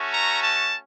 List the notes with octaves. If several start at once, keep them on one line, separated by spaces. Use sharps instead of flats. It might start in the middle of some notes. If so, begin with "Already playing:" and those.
Already playing: A3 C#4 F#4
A#5
A5